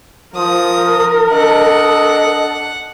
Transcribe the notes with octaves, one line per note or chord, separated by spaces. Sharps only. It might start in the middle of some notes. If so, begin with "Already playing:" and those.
F3 A#4 D#6
D4 A4 D#5 F#5